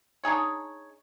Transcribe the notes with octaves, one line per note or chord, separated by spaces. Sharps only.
D4 D#4 G#4 C#5